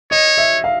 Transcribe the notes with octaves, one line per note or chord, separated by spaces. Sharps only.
C#5 D#5
E5
F5